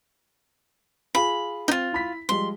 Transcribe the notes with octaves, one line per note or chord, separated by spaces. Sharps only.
F4 G#4 B5
C4 D#4 F4
E4 B5 B6
F3 G3 G#3 C6